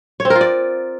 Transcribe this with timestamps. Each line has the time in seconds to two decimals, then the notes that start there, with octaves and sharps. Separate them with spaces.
0.20 C#5
0.25 C4
0.30 A#4
0.35 F4
0.41 D5